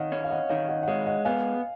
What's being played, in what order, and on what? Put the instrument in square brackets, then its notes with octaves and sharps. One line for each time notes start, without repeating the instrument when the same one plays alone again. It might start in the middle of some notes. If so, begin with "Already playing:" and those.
Already playing: [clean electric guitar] D#3 [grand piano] C#5 D#5 F5 F#5
[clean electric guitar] C#4
[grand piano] F5
D#5 F#5
[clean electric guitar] D#3 [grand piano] C#5 F5
[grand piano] D#5 F#5
F#5
[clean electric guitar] G#3 [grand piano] C#5 F5
[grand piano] D#5 F#5
[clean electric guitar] B3 [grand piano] F5 G#5